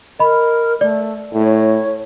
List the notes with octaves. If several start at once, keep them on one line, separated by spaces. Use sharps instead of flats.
A#4 D#5 B5
A3 D5
A2 C#5